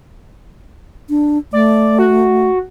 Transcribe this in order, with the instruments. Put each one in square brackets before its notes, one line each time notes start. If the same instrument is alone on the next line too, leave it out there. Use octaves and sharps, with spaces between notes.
[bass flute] D4
[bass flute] A3 [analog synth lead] D5
[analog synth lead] F#4